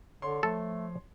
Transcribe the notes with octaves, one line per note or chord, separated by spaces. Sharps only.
D3 C#5 C6
F3 A3 A4